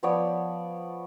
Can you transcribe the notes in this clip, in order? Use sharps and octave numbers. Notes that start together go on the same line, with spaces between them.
F3 B3 C#5 D5